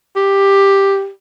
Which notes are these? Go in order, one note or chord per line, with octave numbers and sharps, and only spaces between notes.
G4